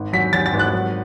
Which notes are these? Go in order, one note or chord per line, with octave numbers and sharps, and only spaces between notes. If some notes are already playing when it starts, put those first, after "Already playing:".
Already playing: G#1
F#3 B6
F#3 A6
A6
G#1
F#6
F#3